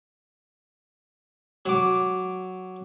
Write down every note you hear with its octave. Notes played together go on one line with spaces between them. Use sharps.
F#3 D6